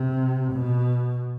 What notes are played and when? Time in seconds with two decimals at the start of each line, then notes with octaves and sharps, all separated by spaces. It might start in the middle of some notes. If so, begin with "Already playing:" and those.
Already playing: C3
0.53 B2